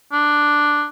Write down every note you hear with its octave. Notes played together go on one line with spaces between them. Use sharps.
D4